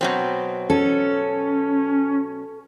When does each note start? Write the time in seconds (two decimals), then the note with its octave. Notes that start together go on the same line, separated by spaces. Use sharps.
0.01 B2 F#3 C4
0.70 C#4 A4